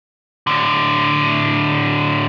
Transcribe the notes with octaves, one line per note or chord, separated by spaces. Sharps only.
A2 D3